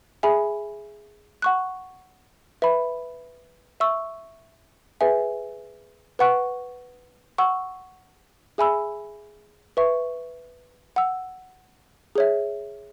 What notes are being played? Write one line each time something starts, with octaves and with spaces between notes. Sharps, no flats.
G#4 E5 G#5 B5
F#5 C#6 F#6
B4 E5 B5
E5 C#6 E6
G#4 B4 E5 G#5
B4 F#5 C#6 F#6
F#5 C#6 E6
G#4 E5 G#5 B5 E6
B4 E5 C#6
F#5 E6
G#4 C#5 E5